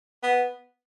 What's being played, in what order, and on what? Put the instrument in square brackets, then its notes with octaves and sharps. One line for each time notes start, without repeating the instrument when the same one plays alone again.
[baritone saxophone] B3